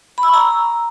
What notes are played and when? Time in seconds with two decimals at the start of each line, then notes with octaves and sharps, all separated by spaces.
0.18 B5
0.23 E6
0.28 C#6
0.34 A#5